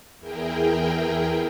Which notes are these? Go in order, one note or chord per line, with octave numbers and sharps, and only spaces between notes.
E2 E4 G#4 A#4 G5